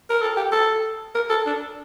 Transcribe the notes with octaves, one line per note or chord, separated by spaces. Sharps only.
A#4
A4
G4
A4
A#4
A4
D4